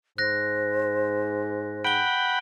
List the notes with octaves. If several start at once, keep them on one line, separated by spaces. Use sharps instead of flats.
G#2 C5 F#6 A#6
F#5 G5 B5 D7 G7